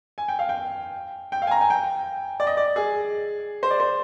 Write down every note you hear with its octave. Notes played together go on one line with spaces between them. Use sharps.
G#5
G5
F5
G5
G5
F5
G#5
A#5
G#5
G5
D5
D#5
D5
G#4
C5
D5
C5